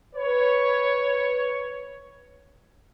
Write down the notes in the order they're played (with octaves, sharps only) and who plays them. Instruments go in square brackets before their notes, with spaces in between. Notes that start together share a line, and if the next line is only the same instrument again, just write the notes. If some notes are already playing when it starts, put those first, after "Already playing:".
[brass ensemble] B4 C#5